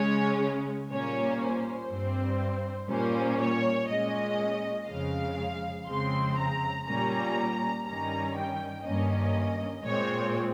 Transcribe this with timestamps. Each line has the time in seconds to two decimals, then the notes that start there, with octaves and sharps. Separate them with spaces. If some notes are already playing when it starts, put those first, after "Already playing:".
Already playing: C#3 G#3 C#4 C#5
0.90 A#2 G3 A#3 C#4 C#5
1.40 C5
1.90 G2 G3 C4
2.89 A#2 G3 A#3 C#4 C5
3.39 C#5
3.88 A#2 G#3 C#4 D#5
4.87 F2 C#3 G#3 F5
5.87 F2 C#3 G#3 C4 C6
6.37 A#5
6.86 A#2 G3 A#3 C#4 A#5
7.85 G2 D#3 G3 C#4 A#5
8.35 G5
8.85 G2 D#3 A#3 C#4 D#5
9.84 A#2 G#3 C4 C#5